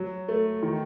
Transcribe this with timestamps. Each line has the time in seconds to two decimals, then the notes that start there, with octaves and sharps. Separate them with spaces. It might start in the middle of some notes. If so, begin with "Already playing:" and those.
Already playing: F#3
0.28 A3
0.63 D#3